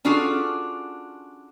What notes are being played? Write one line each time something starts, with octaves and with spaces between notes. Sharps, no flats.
C#4 D4 F4 F#4 G#4 A4